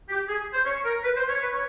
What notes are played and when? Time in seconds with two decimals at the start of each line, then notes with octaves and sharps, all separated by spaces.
0.09 G4
0.28 G#4
0.53 C5
0.65 C#5
0.85 A#4
1.04 B4
1.16 C5
1.29 C#5
1.41 B4
1.53 C#5